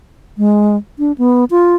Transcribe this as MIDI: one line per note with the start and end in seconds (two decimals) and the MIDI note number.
0.38 0.76 56
0.99 1.12 62
1.18 1.45 59
1.51 1.76 65